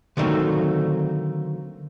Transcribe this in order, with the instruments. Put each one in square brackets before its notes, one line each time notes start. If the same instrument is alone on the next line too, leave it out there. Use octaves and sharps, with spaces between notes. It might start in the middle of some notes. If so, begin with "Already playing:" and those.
[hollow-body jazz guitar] D3 D#3 F#3 A3 A#3 C4